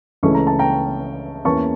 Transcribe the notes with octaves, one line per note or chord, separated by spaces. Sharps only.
C#2 C#3 E3 A3 C#4 C#6
A#5
A5
G5 A#5
E2 E3 A#3 C#4 A5 C#6